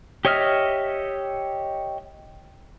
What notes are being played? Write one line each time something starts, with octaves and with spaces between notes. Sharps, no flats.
G4 C#5 D#5 E5 F6